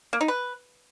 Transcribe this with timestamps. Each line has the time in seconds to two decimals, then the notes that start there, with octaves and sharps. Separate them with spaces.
0.13 A#3
0.21 D#4
0.28 B4